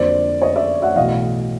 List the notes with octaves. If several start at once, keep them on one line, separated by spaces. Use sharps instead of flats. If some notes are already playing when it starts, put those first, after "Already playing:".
Already playing: F2 D3 F#3 A#3 C5 D5
C#5 D#5
D5 E5
E5 F#5
B1 A2 E3 D#5 F5